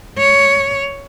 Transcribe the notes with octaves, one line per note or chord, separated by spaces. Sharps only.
C#5